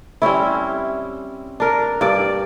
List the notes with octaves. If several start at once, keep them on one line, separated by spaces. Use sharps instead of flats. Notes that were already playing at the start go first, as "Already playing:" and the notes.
G3 C4 C#4 E4
D4 A#4
G2 D5